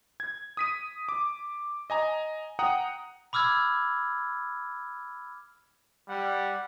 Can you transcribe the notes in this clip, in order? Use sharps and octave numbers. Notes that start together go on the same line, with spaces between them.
G#6
D#6 B6 D#7
D6
D#5 G#5 A#5
F#5 G5 A#5 D#6
B5 D6 E6 F6 G#6
G3 F#5